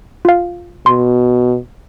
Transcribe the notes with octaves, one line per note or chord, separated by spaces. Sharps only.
F4 F5
B2 C6